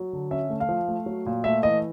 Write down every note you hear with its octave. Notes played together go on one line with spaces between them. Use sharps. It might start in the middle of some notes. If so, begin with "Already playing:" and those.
Already playing: F#3
D3
C#4 E5
A3
F5
F3
A3
F#3
A#2
A3 E5
E3 D#5